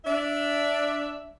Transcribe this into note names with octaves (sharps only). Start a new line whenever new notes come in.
D4 E5